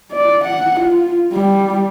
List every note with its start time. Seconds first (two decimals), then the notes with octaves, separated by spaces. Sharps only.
0.12 D5
0.44 F#5
0.80 F4
1.33 G3